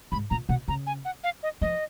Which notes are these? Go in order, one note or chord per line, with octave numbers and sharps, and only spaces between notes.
G#2 B5
A#2 A#5
B2 F#5
C#3 A#5
G#5
F#5
F5
D#5
F3 D#5